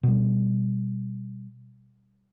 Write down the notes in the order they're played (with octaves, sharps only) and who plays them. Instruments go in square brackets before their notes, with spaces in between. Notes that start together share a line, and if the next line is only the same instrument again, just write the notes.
[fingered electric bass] B2 G3